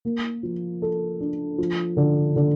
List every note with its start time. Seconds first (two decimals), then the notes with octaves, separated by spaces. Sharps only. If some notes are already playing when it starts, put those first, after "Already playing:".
0.05 A#3
0.43 F3
0.82 A4
1.20 D4
1.58 F3
1.97 D3
2.36 D3